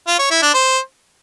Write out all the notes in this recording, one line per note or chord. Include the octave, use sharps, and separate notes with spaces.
F4
C#5
E4
D4
C5